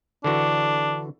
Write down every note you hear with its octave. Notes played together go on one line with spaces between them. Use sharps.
D3 E3 D4 F#4